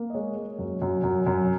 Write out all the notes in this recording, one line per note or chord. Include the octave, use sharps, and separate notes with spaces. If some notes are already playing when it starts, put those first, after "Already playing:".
Already playing: A#3
D#5
G#3 C#5
G#3
F#2
F#2
F#2
F#2